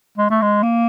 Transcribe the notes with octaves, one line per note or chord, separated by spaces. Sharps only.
G#3
A3
G#3
A#3